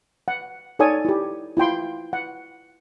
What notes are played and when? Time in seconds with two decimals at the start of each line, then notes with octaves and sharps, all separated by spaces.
0.28 F#5
0.79 D#4 A4 C#5 D5 G#5 D#6
1.05 E4 G4
1.57 E4 F4 G5 C6
2.13 F#5